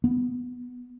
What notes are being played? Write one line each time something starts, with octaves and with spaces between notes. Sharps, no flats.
B3